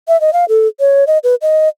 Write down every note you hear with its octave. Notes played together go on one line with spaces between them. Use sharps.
E5
D#5
F5
A4
C#5
D#5
B4
D#5